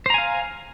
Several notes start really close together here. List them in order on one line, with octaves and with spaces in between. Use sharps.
C5 A#5 G#5 F5